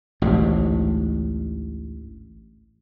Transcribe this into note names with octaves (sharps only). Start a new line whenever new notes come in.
A1 D2 G#2